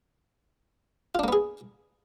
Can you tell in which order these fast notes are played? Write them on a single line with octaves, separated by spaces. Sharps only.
F4 D4 A#3 B3 G#4